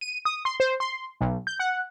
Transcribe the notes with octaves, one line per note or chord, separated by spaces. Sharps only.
D#7
D#6
C6
C5
C6
B1
G6
F#5